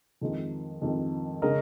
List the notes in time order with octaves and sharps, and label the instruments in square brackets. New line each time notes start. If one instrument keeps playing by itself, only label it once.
[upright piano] F2 D#3 G#3
F2 D#3 G#3
[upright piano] C#3 G#3 C#4 [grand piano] A#4 D#5